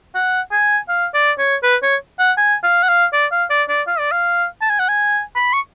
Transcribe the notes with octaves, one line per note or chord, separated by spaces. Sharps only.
F#5
G#5
F5
D5
C#5
B4
C#5
F#5
G#5
F5
F#5
F5
D5
F5
D5
D5
F5
D5
F5
A5
G#5
F#5
G#5
B5
C#6